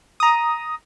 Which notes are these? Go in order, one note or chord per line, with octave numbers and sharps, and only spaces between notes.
A#5 D#6